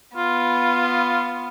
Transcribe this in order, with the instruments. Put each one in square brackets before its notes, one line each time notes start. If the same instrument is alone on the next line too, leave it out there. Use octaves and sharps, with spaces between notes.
[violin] B3 [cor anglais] F4